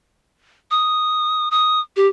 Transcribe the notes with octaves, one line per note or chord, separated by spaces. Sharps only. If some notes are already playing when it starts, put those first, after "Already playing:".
D#6
D#6
G4